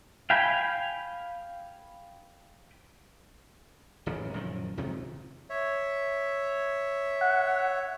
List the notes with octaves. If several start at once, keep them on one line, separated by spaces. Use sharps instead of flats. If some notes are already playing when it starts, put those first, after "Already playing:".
F5 G5 G#5 B5
D1 A1 F#2 C#3
F#2 A#2 D#3 F3
C#2 C3 D#3 F3
C#5 E5
F#5